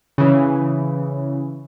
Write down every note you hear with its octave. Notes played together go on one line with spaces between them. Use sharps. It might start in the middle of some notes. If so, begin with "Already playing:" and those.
C#3 E3